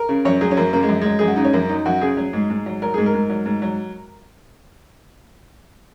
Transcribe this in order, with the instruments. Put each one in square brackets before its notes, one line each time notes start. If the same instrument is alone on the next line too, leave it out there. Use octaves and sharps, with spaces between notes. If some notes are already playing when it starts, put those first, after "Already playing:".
Already playing: [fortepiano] A#4
C#3
F#2 C#5
F#3 G#4
C#4
F#2 A#3
C#3 A#3
G#3
F#2
F#3 G#3
F#2 G#4
F#4
C#3 D#4
C#4
F#2 A#3
F#3 D#4
F#2 F#4
C#3 G#4
F#3
G#2
G#2
F#3
F#3 A#4
G#2 G#4
A#4
G#2
F#3
G#2
F#3